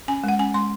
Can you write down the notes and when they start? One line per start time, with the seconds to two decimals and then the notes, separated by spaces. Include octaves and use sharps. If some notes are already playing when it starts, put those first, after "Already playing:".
0.08 C#4 G#5
0.24 G#3 F#5
0.39 C#4 G#5
0.54 G#3 C6